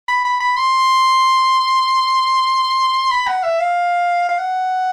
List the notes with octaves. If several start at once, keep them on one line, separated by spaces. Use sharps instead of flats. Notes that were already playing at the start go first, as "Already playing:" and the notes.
B5
B5
B5
C6
B5
F#5
E5
F5
F5
F#5